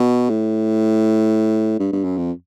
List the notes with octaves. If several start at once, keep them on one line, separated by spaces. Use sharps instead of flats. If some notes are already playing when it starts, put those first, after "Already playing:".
Already playing: B2
A2
G2
G2
F#2
F2